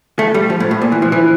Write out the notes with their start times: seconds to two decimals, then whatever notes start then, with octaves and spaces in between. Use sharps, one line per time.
0.19 A3
0.34 G3
0.50 F3
0.60 A2
0.71 A2
0.82 A#2
0.92 E3
1.02 F3
1.12 E3